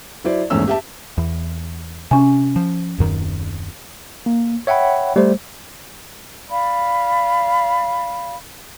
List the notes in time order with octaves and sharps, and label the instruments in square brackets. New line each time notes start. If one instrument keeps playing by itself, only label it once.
[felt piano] F#3 E4 C5 D5
A#1 E2 G#2 A3 C#4 E6
G4 E5 A5
[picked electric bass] E2
[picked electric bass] C3 [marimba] C#4 G#5
[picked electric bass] F3
D#1 F#2 D#3
[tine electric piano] A#3
C#5 E5 F#5 G5 B5
G3 A3 C5
[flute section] D5 F5 B5